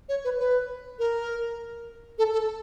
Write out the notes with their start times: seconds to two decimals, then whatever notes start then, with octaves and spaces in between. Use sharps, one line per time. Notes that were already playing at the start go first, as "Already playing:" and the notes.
0.09 C#5
0.24 B4
0.39 B4
0.99 A#4
2.18 A4
2.33 A4